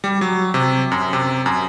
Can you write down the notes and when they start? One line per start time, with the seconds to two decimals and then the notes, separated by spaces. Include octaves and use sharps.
0.04 G3
0.21 F#3
0.54 C3
0.92 F#2
1.13 C3
1.46 F#2